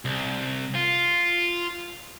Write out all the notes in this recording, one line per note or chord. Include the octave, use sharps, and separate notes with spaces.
C2
F4